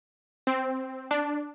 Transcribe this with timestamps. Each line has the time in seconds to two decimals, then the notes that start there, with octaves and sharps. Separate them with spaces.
0.47 C4
1.11 D4